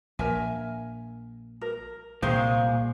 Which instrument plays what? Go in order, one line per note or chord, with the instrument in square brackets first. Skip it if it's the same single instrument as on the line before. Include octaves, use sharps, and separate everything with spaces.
[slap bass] A#1 [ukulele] A#4 E5 G#5
[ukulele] A#4
[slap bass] C2 [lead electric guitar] A#2 [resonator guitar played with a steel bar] D#3 G#3 C5 [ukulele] F5